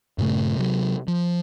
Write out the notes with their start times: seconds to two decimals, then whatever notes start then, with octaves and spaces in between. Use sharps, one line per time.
0.18 G2 A#2 C#3 A3
0.56 C3 F#3
1.08 F3